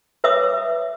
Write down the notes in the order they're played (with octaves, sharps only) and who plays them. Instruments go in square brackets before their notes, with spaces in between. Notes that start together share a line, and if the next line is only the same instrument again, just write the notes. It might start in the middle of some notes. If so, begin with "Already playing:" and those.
[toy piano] B4 C#5 E5 D6 D#6